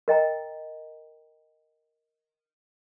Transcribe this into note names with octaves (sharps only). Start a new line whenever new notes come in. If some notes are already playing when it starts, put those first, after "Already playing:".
A#4 D#5 G5 A#5